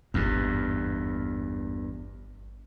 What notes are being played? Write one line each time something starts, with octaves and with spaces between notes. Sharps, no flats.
G#1 E2 G2 E3